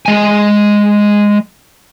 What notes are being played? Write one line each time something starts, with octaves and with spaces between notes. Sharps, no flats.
G#3 G#5